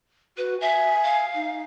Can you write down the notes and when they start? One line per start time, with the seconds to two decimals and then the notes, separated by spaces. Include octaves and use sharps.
0.37 F#4 B4
0.61 E5 G#5
1.03 F5
1.35 D#4